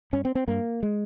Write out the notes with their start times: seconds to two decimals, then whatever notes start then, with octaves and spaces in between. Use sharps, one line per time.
0.13 G2 C#4
0.25 C4
0.35 C4
0.48 G2 A#3
0.83 G#3